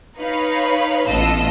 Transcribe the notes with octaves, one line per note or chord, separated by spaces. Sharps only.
D#4 B4 C#5 F5 B5
A1 B3 F4 A4 D#5 E6